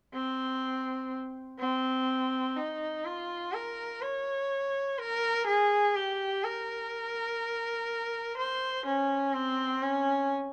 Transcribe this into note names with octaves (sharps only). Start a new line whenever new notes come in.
C4
C4
D#4
F4
A#4
C#5
A#4
G#4
G4
A#4
C5
C#4
C4
C#4